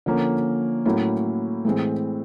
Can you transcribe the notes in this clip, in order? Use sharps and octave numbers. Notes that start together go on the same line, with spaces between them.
D3 F3 A#3 C#4
A2 F#3 A#3 C#4 E4
A2 E3 G#3 C4